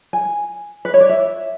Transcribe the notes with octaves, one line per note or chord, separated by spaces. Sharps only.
G#5
B4
C#5
D5
E5